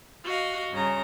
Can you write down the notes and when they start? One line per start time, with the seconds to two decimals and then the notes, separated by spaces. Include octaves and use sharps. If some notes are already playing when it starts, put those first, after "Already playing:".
0.24 F#4 D#5 F5
0.72 G2 C#3 A#5